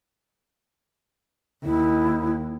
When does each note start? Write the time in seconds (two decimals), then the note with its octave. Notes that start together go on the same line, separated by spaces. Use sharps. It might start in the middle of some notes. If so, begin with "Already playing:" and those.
1.65 D#2 E4